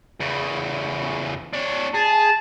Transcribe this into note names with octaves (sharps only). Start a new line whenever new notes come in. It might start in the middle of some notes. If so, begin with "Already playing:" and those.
E2 C#3
D4 C#5
G#4 A5